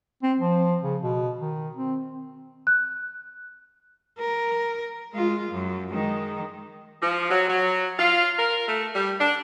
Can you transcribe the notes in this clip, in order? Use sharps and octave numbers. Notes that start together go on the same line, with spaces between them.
C4
F3
C#3
B2
D#3
C4
F#6
A#4
G#3 F4
F#2
D#3 G#3
F3
F#3
F#3
F4
A#4
A3
G3
D4